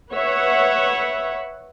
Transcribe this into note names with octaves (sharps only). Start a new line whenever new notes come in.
B4 C#5 E5 F#5